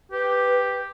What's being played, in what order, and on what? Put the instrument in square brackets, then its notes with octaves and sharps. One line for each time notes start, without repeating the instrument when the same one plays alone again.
[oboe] G4 [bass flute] B4